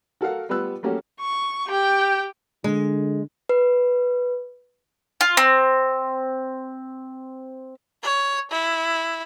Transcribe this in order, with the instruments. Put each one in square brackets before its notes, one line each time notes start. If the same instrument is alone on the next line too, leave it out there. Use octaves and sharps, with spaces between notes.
[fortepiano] F#4 A4 A#4 F5 F#5
G3 B3 F4 B4 E6 F#6
A3 A#3 C#4 F#4 G4 A4
[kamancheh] C#6
G4 G5
[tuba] D3 [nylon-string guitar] G#3
[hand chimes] B4
[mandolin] F4
C4
[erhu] C#5
E4